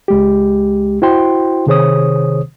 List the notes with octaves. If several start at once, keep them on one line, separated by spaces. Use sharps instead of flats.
C#2 G#3 G4
E4 F#4 C5 G5 C6
C3 D#3 G#4 C5 C#5 D#6